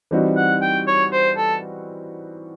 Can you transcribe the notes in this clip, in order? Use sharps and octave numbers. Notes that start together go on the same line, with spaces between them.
E3 G3 C4 D#4 F#4
F#5
G5
C#5
C5
A4